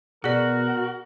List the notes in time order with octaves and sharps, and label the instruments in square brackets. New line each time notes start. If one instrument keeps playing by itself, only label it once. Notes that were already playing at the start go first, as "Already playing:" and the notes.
[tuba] B2 [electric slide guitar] F#4 [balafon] G#4 D5 [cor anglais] A#4